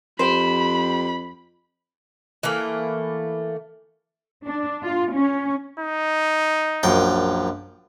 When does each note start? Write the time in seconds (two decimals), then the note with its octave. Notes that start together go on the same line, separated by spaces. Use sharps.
0.19 F2 G4 C5 B5
2.43 E3 A3 A#3
4.46 D4
4.83 F4
5.14 C#4
5.80 D#4
6.83 A#1 F#2 G5